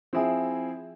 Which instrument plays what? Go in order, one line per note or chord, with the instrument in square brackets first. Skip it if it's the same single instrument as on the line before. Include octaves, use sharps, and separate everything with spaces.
[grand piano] F3 C4 E4 G#4